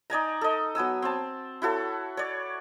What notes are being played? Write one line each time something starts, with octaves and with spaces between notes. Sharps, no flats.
D#4 D5 G#5 A#5
A4 D#5
F#3 B3 G#5 E6
C4 A5
E4 F#4 A4 C#5
C#5 D5